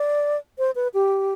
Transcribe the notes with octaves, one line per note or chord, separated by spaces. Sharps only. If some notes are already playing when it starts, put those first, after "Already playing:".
Already playing: D5
C5
B4
G4